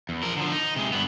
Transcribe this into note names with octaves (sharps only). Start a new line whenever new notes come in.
E2
F3 A#4
D3 F3
D#4
C3 G#3
G2 B3